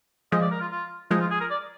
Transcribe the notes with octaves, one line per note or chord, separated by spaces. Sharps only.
F3 G#3 D#5
D5
A#4
F4
F4
F3 G#3 D#4
F4
G#4
A#4
D5